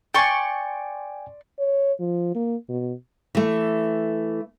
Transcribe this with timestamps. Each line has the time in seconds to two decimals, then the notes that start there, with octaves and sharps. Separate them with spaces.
0.14 D5 G5 G#5 C6 C#6
1.59 C#5
2.00 F3
2.35 A#3
2.69 B2
3.35 E3 A3